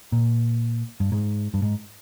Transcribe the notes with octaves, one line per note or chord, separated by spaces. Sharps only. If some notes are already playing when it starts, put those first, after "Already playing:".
A#2
G2
G#2
G2
G#2